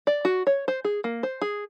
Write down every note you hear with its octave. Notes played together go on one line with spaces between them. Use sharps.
D5
F#4
C#5
C5
G#4
A#3
C5
G#4